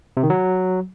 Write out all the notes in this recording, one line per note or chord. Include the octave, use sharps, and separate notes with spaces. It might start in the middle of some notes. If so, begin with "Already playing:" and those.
C3
D#3
F#3